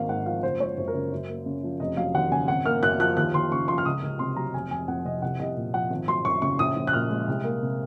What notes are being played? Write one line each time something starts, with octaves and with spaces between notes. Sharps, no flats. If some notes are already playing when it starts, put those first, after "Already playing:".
Already playing: G#1 A#3 F5
G#2 F#5
F3 F5
F#1 C5
G#3 C#5
F#2 C5
A#4
C#3 C5
F#2
A#3
C#3
F3
F1 D#5
F#3 F5
D#2 F#5
C#3 G#5
G#1 F#5
A#3 F6
F#2 F#6
F3 F#6
D#2 F#6
D#2 C6
C#3 C#6
F3 C6
F6
C#2 D#6
C#2
C3 C6
F#3 A#5
F1 G#5
F1 G#5
F2 F#5
C3 D#5
C2 F#5
C2 D#5
A#2
F3 F#5
G#1
F#3 C6
F#2 C#6
C#3 C#6
A#1 D#6
A#1
F#6
A#2 F6
G#3
C2
A#3
C3